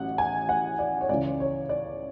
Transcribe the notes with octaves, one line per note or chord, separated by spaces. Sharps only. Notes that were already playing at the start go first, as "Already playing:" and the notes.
Already playing: A1 A2 F#3 C#4 F#5
G#5
F#5
D5
C#5
C#2 C#3 E3 D5
C#5
D5